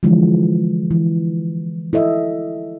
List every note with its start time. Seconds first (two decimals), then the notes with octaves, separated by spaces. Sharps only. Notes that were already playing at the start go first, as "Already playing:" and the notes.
0.03 D3 E3 F3 G#3
0.91 E3
1.93 E4 A4 D#5 E5